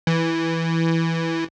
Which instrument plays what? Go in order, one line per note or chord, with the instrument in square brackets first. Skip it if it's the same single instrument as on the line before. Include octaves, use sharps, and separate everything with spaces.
[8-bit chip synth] E3